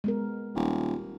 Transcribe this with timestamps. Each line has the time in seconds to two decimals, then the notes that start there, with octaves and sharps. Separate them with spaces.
0.04 G#3 B3 A#4
0.55 D#1